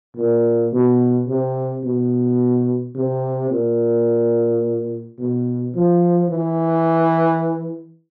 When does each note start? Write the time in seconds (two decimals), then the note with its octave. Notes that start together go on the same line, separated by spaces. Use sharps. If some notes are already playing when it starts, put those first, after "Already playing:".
0.16 A#2
0.73 B2
1.28 C3
1.84 B2
2.95 C3
3.51 A#2
5.19 B2
5.75 F3
6.30 E3